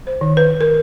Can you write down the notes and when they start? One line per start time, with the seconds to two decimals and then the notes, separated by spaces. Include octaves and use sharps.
0.07 C5
0.21 D#3
0.37 B4
0.61 A#4